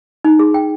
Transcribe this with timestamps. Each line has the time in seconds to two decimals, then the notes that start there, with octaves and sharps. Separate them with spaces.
0.24 D#4
0.39 G#4
0.54 G5